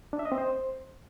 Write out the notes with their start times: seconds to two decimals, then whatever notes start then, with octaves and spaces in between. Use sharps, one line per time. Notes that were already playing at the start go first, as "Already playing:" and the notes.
0.13 D4
0.19 E5
0.25 D#5
0.32 C4
0.38 C5